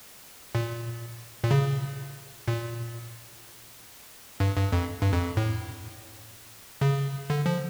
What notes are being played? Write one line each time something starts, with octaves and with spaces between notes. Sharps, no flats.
A#2
A#2
C#3
A#2
G2
G2
F2
G2
F2
A2
C#3
D3
F3